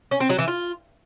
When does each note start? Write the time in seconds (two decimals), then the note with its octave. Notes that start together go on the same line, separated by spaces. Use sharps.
0.11 C#4
0.20 C4
0.29 F#3
0.39 E3
0.48 F4